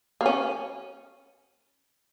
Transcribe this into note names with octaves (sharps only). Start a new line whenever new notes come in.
A#3
C#4